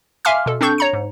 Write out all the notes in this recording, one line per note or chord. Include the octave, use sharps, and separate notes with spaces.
E5 F5 G#5 C6 D6 F6
B2 A4
C4 D4 A4 C#6 G6
C#5 A#5 C#7
G#2